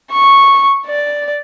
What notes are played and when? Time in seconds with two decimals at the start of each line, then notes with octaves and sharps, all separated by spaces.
0.12 C#6
0.87 D5